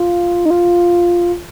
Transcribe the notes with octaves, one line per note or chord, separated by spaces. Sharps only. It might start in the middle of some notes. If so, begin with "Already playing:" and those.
Already playing: F4
D#4
F4